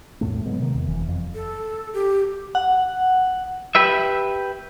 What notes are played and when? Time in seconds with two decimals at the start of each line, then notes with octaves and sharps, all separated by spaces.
0.21 E2 A2 A3
0.46 C#3 F#3 G#3 B3
0.59 C3 D#3
0.75 E2
0.88 F1 E3
1.08 F2
1.34 A4
1.94 G4
2.55 F#5
3.75 G4 B4 E5